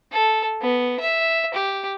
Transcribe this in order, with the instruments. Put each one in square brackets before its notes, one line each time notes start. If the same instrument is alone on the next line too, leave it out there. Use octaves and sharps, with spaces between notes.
[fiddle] A4
B3
E5
G4